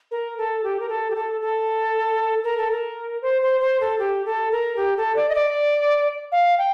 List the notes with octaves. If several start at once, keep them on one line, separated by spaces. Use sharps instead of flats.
A#4
A4
G4
A#4
A4
G4
A4
A4
A#4
A4
A#4
C5
C5
C5
A4
G4
A4
A#4
G4
A4
D5
D#5
D5
F5
G5